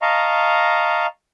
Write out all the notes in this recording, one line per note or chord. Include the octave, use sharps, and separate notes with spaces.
D#5 F5 A5 A#5 C#6